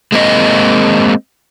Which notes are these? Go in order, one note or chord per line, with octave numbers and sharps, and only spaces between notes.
G#3 A#3 C4 D4 D#5